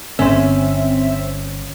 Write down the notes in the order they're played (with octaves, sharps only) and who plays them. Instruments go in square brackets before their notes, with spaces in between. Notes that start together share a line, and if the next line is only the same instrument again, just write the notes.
[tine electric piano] G1 [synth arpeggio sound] C4 E5 [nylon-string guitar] C#4